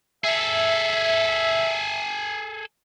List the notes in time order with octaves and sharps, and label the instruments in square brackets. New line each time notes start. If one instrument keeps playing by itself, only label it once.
[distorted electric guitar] G#4 A4 [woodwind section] E5